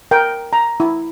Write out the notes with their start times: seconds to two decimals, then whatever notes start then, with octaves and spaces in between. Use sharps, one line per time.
0.11 A#4 G5
0.53 A#5
0.80 E4